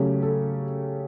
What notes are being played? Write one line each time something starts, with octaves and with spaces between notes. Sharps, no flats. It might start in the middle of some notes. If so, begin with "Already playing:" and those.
Already playing: C#3 F#3 A3 C#4 G4
A4